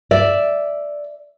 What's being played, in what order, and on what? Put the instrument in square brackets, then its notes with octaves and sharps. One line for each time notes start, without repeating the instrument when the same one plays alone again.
[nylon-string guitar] D5 E5